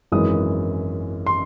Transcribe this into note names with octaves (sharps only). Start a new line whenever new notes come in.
G#1 F#2 E3 G#3 D#6
C6